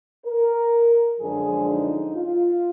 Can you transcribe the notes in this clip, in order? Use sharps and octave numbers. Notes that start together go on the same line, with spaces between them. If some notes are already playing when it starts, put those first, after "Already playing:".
A#4
F#2 D3 F3 G#3 G#4
D#4
F4